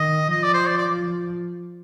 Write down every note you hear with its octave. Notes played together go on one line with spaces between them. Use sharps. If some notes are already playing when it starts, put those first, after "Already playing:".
Already playing: D#3 D#5
F3 D#5
D5
C5
D5
D5